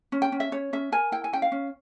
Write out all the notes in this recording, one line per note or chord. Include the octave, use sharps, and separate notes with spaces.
C#4
G5
C#4
E5
C#4 C#5
C#4 E5
A#4 G#5
E4 G5
G#5
C#4 G5
F5
C#4